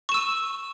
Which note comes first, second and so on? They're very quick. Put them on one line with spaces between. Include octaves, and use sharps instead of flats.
C#6 E7 E6 D#7